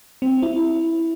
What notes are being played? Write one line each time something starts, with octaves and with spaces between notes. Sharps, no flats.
C4
E4